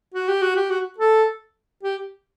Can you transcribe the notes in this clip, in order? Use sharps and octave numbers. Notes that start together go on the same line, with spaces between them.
F#4
G4
F#4
G4
F#4
A4
G4